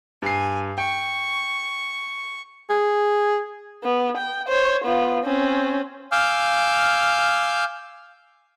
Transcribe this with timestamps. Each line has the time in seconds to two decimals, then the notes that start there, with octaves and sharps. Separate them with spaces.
0.22 G2 G#5 C7
0.78 G5 C#6
2.70 G#4
3.84 B3
4.17 G5
4.48 C5 C#5
4.84 B3 F4
5.25 C4 C#4
6.12 F5 G#5 D6 E6 F6 G6